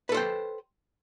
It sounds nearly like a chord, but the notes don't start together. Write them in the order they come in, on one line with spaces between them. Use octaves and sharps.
B4 A4 C5 G5